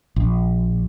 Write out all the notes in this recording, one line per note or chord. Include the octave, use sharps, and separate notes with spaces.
A#1